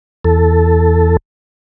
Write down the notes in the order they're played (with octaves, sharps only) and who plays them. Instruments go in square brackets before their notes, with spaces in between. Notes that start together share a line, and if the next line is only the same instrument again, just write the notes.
[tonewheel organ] E2 A4